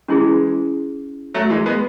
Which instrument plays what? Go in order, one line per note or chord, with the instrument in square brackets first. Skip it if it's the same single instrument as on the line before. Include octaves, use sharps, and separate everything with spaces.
[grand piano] E3 G#3 [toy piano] C#4 E4 G#4
[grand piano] F#3 A3
E3 G#3
G#3 B3